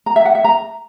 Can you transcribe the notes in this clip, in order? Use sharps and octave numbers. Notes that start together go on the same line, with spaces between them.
A#5
E5
F#5
E5
A#5